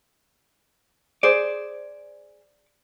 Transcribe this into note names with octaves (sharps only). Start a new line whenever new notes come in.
G#4 C5 D5